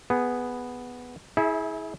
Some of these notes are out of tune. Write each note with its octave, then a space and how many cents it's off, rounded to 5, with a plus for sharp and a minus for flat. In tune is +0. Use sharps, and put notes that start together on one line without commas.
B3 +0 G#4 +0
E4 -30 G#4 +20 E5 +0